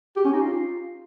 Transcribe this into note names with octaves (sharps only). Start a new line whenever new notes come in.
G4
C#4
D#4
F4